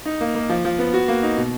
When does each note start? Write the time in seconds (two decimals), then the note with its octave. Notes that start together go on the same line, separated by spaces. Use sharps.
0.06 D#4
0.21 A#3
0.35 A#3
0.50 F3
0.65 F3
0.79 B3
0.94 F#4
1.08 A#3
1.23 D#4
1.37 B2